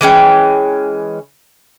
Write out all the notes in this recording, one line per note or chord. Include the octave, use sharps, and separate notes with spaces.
E3 G#3 C#4 G5